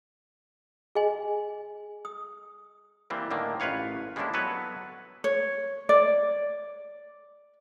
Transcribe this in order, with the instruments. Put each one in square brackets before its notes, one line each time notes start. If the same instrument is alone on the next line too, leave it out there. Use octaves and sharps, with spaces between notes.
[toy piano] G#4 D#5 G#5 C6
D#6
[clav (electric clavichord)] E3 G3 A#3 C4
A2 D3 D#3 A#3
A1 F4 B4 C#5 F5
G3 G#3 A#3 C#4 D4 E4
F#3 B3 A4 B4 C#5
[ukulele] C#5
D5